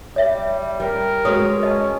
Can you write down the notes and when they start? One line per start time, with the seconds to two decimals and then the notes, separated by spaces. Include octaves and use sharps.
0.16 G3 C#5 E5
0.80 G3 A#4
1.25 G#3 F#4 B4 C#5 D#6
1.63 C#4 D#5 A5